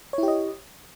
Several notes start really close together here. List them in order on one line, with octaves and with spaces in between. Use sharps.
C#5 E4 G4 D#5